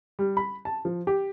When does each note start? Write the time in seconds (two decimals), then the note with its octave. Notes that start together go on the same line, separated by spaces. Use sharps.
0.19 G3
0.37 B5
0.65 A5
0.85 F3
1.07 G4